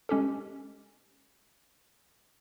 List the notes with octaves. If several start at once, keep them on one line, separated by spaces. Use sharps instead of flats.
G#3 C#4 G4 A4